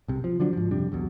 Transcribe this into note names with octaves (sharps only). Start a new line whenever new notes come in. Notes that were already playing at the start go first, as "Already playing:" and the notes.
C2 C3
F3
D3 F3 F#3 D4
G#2 F3
F2 C3 G3 D4
B1 E2 B2